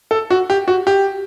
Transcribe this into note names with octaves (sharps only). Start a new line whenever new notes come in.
A4
F#4
G4
F#4
G4